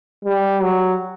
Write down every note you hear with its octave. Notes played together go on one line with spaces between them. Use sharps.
G3
F#3